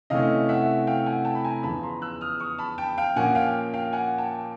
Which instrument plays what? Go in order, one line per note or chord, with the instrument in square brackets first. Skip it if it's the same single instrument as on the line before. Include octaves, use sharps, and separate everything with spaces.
[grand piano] C3 E3 A3 C#4 D#5 F5
E5 F#5
F5 G5
F#5 G#5
G5 A5
B5
G#5 A#5
E2 C#3 F3 A5 B5
A#5 C6
E6 F#6
D#6 F6
C#6 D#6
A5 B5
G5 A5
F5 G5
A#2 F3 A#3 C#4 F#5 G#5
F5 G5
F5 G5
F#5 G#5
G5 A5